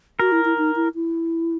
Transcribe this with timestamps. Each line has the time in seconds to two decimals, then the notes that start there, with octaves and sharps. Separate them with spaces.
0.19 F#4 A#4
0.32 E4
0.45 E4
0.58 D#4
0.76 E4
0.95 E4